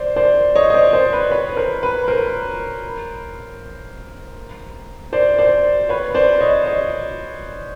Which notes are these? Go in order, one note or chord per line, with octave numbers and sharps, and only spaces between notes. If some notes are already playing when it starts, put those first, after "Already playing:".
Already playing: C5 D5
C5 D5
C#5 D#5
D#5
C5 D5
C5 D5
B4
B4 C#5
A#4 C5
B4
A#4 C5
C5 D5
C5 D5
B4 C#5
C5 D5
C#5 D#5
C#5 D#5